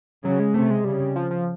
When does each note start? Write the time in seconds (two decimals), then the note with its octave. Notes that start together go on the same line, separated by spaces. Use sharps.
0.25 C#3 F#3
0.40 G#3
0.54 C3 A3
0.70 G#3
0.85 C#3 G3
1.16 F3
1.31 F3